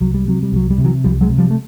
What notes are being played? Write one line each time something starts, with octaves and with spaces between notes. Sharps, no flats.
C2 F#3
G3
C3 F#3
G3
C2 F#3
G3
C3
E3 F#3
C2 F3 G3
F#3 G#3
C3
F3 G3
A3